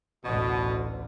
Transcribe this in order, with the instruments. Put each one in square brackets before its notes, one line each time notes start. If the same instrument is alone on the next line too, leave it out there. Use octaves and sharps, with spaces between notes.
[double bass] A1 D2 [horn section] B2